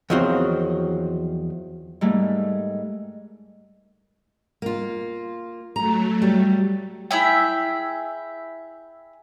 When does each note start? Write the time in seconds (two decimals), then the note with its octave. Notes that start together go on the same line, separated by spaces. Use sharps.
0.10 E2 D#3 F3 F#3 C4
2.01 G#2 G3 A3 A#3
4.62 A#3 F4
5.76 F#3 A3 A#5
6.22 G3
7.11 E4 G#4 E5 G5